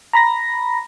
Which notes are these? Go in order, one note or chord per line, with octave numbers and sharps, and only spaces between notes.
A#5 B5 A#6